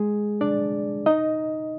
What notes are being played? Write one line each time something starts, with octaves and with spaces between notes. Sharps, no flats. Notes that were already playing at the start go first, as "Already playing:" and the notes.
Already playing: G#3 G#4
D4 D5
D#4 D#5